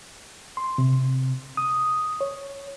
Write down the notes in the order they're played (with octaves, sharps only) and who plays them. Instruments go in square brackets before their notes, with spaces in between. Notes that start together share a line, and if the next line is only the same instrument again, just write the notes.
[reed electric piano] C6
C3
D#6
C#5